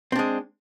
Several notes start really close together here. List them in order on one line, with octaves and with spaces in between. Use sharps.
C4 D4 G#3